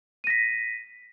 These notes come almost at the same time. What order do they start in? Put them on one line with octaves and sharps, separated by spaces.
D#7 A#6 B6